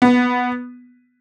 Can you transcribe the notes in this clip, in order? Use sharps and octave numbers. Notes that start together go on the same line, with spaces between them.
B3